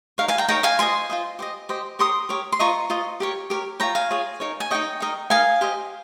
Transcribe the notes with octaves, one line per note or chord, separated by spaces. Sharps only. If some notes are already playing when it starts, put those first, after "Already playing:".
D#4 A#4 C#5 F5
F5 G#5
G5 A#5
D#4 A#4 C#5 G5 A#5
F5 G#5
F4 C5 D#5 G#5 C6
F4 C5 D#5
G4 C5 D#5
G4 C5 D#5
G4 A#4 C#5 C6 D#6
G4 A#4 C#5
C6
F4 C5 D#5 A#5 C#6
F4 C5 D#5
G4 A#4 C#5
G4 A#4 C#5
F4 G#4 C#5 G5 A#5
F5 G#5
F4 G#4 C#5
D#4 A#4 C#5
G#5
D#4 A#4 C#5 D#5 G5
D#4 A#4 D#5
D#4 A#4 D#5 F5 G#5
G4 C5 D#5